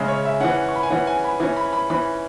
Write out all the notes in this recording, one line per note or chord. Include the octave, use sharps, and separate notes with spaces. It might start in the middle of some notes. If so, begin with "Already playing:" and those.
Already playing: C#3 G#3 C#4 E5
C#5
E5
E3 C#4 F#5
C#6
B5
G#5
E3 C#4 F#5
G#5
B5
E3 C#4 G#5
B5
B5
E3 C#4 B5